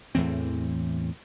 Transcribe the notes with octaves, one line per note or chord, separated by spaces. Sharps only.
E2 A2 E3 C4